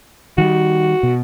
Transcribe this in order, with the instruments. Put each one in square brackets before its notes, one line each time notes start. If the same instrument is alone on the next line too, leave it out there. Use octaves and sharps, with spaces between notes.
[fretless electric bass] D#3 G3 [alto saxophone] F#4
[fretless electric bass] B2